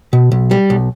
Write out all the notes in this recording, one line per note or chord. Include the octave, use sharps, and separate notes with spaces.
B2
B1
G3
B1